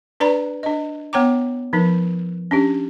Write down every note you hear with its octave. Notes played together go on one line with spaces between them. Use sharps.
D4 B4 D5 A#5 B5
D4 D#5
B3 C#5 G5 A#5 D6
F3 D#4 A#4
C#4 D4 G4